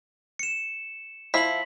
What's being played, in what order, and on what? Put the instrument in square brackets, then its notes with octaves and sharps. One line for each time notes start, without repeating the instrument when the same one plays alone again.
[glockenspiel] C#7 E7
[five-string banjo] F3 E4 [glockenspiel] B6 F#7